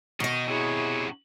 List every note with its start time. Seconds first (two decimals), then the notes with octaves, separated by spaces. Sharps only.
0.20 B2 D#3 D#4 D#5
0.48 C3 E4 F#4 G#4 C#5